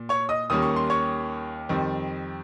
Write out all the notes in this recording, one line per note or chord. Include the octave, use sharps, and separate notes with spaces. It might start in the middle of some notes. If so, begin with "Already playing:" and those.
Already playing: A#2
C#5 C#6
D#5 D#6
D#2 D#3 G3 A#3 C#4 D#6
C#6
C6
C#5 C#6
F2 D#3 G3 C4